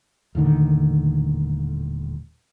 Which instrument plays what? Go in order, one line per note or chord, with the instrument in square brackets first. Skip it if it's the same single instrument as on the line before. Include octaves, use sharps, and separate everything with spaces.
[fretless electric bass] D#1 A2 D3 D#3